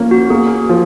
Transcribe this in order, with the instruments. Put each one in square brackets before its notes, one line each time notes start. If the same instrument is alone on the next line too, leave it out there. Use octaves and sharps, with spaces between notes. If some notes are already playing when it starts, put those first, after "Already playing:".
Already playing: [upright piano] F3 A#3 C#4
[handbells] F#4
[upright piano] A#3 [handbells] G#4
[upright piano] F3